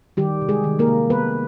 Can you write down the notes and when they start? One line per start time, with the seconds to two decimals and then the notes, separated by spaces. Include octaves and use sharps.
0.17 D#3 G3 G4
0.41 C3
0.49 G#3 G#4
0.64 D#3
0.79 A#3 A#4
0.87 C3
1.10 G3 B3 B4